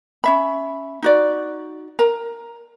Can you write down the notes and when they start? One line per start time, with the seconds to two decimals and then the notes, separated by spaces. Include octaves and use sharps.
0.24 C#4 E5 B5
1.02 D#4 F#4 D5
1.99 A#4 A#5